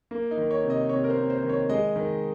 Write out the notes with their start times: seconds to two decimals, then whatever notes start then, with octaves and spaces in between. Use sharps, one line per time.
0.11 A#3
0.31 D#4
0.37 D#3
0.51 C#5
0.64 C3
0.70 D#5
0.89 C3 C#5
1.04 A#4
1.10 C5
1.16 A#3
1.30 C5
1.43 D#3
1.49 C#5
1.69 G#3 D#5
1.96 D#3